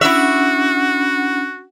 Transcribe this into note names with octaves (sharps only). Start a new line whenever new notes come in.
C#4 D4 E4 F#4 E5 F#5